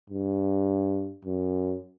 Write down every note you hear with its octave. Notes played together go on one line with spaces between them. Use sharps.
G2
F#2